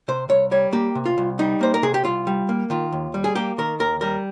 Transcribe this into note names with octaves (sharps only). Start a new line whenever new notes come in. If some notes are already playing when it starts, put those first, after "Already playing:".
C3 C5
C2 C#5
G3 C#5
A#3 G4
C3
F4
C2
G3 D#4
A#3 C5
A#4
C3 G#4
G4
C2 F4
G3
A#3
D#3 F4
D#2
G3
G#4
A#3 G4
D#3 A#4
D#2 A#4
G3 A#4